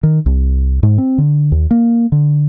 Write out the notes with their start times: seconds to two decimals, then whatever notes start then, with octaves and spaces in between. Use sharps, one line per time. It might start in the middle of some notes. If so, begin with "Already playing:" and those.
0.03 D#3
0.26 C2
0.83 G#2
0.98 C4
1.18 D3
1.52 D#2
1.71 A#3
2.12 D3